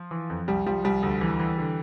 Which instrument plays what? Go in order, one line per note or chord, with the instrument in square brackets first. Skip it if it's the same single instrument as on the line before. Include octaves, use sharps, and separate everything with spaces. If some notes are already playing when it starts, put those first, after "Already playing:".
Already playing: [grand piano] F3
E3
F2
C2 G3
F3 G3
C2 G3
D2
E3
E3
D3